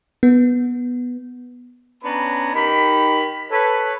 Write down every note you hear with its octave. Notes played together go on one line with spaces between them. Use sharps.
B3
B3 C#4 D4 C#5 A#5 B5
D#3 D#4 G4 B5
A4 B4 C#5